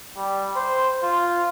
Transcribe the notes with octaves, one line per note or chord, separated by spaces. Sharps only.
G3
C5
F4